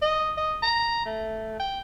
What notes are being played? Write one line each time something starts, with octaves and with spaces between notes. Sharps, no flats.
D#5
D#5
A#5
A3
G5